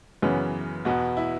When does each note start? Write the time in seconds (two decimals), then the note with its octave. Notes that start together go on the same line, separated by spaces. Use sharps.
0.22 F#2 C#3 E3 B3 C#4
0.85 E2 B2 B3 F#4
1.17 E4